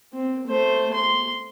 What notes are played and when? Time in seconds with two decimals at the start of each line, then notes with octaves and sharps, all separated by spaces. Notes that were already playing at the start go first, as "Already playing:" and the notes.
0.13 C4
0.48 A3 C5
0.94 C6